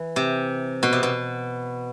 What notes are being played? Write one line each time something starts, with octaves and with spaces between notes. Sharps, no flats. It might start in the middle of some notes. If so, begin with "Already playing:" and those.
Already playing: E3
C3
B2
C3
B2